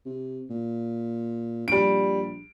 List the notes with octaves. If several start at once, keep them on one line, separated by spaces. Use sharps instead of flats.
C3
A#2
A#1 G3 D7